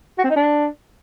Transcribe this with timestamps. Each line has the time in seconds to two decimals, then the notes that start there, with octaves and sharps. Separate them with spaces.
0.19 F#4
0.24 C4
0.30 D#4
0.36 D4